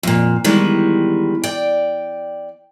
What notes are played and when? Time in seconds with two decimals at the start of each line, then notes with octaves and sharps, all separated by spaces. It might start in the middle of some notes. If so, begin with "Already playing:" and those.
0.03 F2 A#2
0.44 D#3 E3 G3 G#3 B3
1.44 D5 G5